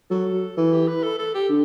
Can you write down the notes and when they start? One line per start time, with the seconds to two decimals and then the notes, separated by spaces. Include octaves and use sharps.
0.11 F#3 A4
0.57 E3 A4
0.72 G4
0.88 B4
1.03 A4
1.19 A4
1.35 G4
1.49 D3